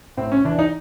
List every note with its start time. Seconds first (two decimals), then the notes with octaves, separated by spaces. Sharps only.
0.17 A2 C4
0.32 C#4
0.45 E3 D4
0.59 D#4